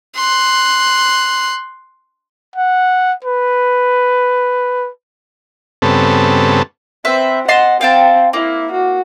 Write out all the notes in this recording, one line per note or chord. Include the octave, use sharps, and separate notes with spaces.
C6 F#6
F#5
B4
G2 C#3 B3 C4 A4
C4 B4 C5 E5
D#5 F#5 A5 C6
C4 F5 G5 A5
A#3 E4
F#4